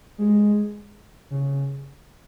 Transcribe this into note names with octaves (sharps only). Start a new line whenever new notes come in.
G#3
C#3